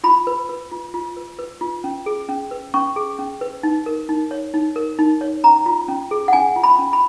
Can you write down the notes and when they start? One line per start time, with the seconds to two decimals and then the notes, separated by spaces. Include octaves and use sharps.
0.04 F4 B5
0.27 B4
0.49 B4
0.72 F4
0.94 F4
1.17 B4
1.39 B4
1.61 F4
1.84 C#4
2.06 G#4
2.29 C#4
2.51 B4
2.74 C#4 C#6
2.96 G#4
3.19 C#4
3.41 B4
3.63 D#4
3.86 A#4
4.09 D#4
4.31 C#5
4.54 D#4
4.76 A#4
4.99 D#4
5.21 C#5
5.44 C#4 A#5
5.66 F4
5.88 C#4
6.11 G#4
6.28 F#5
6.33 C#4 G#5
6.56 F4
6.64 B5
6.79 C#4
6.93 B5